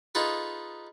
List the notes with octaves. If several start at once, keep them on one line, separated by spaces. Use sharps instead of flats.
D#4 F4 G#4 A4 B4